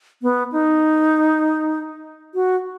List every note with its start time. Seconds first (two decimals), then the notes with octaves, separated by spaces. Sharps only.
0.22 B3
0.52 D#4
2.35 F#4